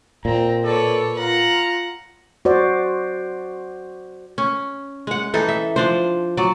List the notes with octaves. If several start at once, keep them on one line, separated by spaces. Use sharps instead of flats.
A#2 C4 A#5
A4 B4 C#5 D5
F4 F#5 A#5
F#4 C5 D5
C#4
G#3 F#5
E3 D#4 A4
E5
F3 D4 C5
F#3 D5